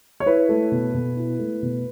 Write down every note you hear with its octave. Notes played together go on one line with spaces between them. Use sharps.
C#5
E4 B4
A3
B2
B2
E4
A3
B2